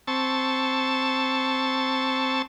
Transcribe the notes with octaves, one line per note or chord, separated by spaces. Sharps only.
C4 A5 C#6 E6